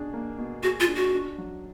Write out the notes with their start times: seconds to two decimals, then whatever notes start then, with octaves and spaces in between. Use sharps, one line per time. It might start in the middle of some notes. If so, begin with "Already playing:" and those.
Already playing: B2 D4 G#4
0.13 A#3
0.38 B2
0.63 F#4 G#4
0.80 F4
0.88 D4
0.96 F#4
1.13 D4
1.38 F#3